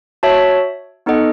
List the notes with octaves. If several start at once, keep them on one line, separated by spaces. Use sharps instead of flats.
F#4 C#5 E5 A5
B3 D#4 A4 D#5 F#5